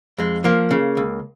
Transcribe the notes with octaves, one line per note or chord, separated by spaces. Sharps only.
F2 G#3
F3 A#3
C#3
C#2